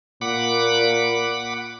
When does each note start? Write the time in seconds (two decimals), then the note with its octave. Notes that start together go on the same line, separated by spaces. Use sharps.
0.21 A#2 F#5 B5 D6